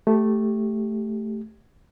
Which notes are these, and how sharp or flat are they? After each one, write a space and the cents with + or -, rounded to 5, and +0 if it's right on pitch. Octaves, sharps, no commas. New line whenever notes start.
A3 +0 G4 +0